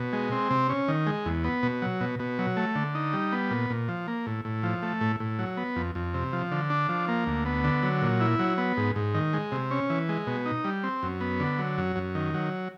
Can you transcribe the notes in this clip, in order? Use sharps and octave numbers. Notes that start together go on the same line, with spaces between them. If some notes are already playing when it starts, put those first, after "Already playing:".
Already playing: B2
G#3
C4
C3
C#4
D#3
G#3
E2
B3
B2
F#3
B2
B2
F#3
A3
D3
D#4
G3
B3
A#2
A#2
F3
A#3
A2
A2
F3
A3
A2
A2
F#3
B3
F2
F2
C3
F3
D3
D4
F3
A#3
D2
B3
D3
F#3
A#2
E4
F#3
B3
G#2
G#2
D#3
G#3
C3
C#4
E3
G#3
B2
D#4
G3
C4
F#2
B3
D3
F#3
F#2
F#2
D#3
F#3